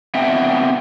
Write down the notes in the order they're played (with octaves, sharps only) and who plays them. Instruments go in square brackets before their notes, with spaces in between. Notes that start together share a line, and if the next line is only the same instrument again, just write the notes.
[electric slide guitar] B3 C4 E5 F#5 G5